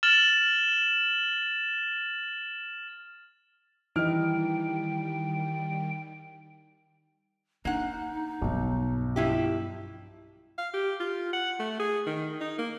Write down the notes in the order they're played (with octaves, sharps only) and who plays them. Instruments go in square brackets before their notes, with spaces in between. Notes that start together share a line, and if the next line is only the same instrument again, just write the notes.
[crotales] F6 A6 E7 F#7
[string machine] D#3 G3 [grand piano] E3 F6 [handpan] D#4 D#5 [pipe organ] G5
[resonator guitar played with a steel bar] A#3 F#5 [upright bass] D4 [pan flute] D#4
[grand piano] B1 [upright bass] G2 B3
[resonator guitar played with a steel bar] F3 E4 G4
[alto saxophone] F5
G4
F4
F#5
A3
G#4
D#3
D#4
A#3